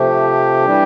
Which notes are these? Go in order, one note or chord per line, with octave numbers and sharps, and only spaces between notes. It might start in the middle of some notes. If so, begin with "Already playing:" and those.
Already playing: C3 F3 A3 G4
E3 G3 D4